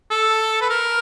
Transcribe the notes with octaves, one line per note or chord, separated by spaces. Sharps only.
A4
B4
A#4